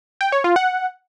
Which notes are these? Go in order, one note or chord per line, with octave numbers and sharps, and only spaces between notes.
G5
C#5
F4
F#5